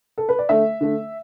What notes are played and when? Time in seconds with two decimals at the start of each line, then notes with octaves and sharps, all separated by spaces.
0.18 A4
0.29 B4
0.39 D5
0.49 D3 A3 E5
0.81 D3 A3